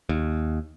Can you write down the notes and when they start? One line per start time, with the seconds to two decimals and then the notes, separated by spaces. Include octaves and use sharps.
0.09 D#2